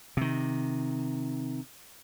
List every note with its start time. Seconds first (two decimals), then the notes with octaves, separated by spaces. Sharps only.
0.17 C3 D#3